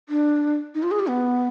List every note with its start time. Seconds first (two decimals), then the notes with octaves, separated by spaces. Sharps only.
0.09 D4
0.75 D#4
0.83 F4
0.91 G#4
0.99 G4
1.07 B3